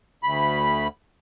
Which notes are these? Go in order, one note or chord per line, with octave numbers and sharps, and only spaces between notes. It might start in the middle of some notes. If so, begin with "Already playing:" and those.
D2 B5